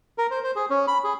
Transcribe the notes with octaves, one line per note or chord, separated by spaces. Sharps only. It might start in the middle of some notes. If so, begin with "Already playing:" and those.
A#4
C5
C5
G#4
C#4
B5
G#4